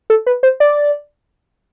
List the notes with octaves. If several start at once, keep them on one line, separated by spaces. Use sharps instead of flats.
A4
B4
C5
D5